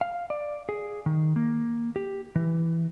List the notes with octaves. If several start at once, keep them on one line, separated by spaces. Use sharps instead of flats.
F5
D5
G#4
D#3
A#3
G4
E3